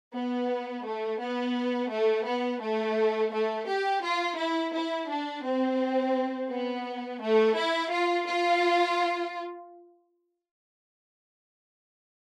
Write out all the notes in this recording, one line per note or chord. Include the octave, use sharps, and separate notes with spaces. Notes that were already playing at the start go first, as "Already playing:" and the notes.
B3
A3
B3
A3
B3
A3
A3
G4
F4
E4
E4
D4
C4
B3
A3
E4
F4
F4